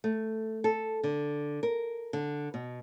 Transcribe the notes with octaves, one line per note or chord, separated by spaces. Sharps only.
A3
A4
D3
A#4
D3
B2